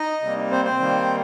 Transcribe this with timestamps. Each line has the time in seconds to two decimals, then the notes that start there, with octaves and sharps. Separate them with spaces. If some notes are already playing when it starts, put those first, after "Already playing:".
Already playing: D#4 D#5
0.22 C3 G3 A#3
0.51 C4 C5
0.65 C4 C5
0.80 D#3 G3 A#3